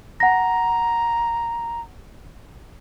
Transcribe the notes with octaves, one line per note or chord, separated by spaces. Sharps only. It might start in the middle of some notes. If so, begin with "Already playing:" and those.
F#5 A#5 A#6